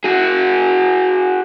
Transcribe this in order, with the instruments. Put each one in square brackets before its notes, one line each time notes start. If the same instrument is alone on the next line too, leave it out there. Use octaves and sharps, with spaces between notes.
[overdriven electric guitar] F#4 G#4